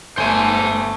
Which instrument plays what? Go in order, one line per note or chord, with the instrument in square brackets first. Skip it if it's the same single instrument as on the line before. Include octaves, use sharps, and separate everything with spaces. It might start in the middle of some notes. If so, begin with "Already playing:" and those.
[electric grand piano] G1 [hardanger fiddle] A3 [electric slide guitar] C5 G#5